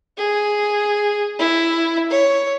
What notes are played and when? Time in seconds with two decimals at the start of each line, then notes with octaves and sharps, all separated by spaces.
0.18 G#4
1.39 E4
2.10 C#5